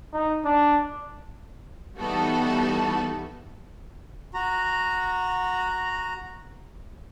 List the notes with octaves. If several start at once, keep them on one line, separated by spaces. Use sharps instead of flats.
D#4
D4
E3 G3 B3 D#4 F#4 A4
F#4 A#5